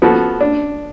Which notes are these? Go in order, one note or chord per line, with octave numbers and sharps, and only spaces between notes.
F3 B3 F#4 A4
D4